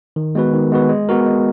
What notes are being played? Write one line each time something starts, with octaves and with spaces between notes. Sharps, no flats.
D#3
G#3 B3 F#4 B4
D#3
G#3 B3 F#4 B4
G#3
B3 F#4 A#4
G#3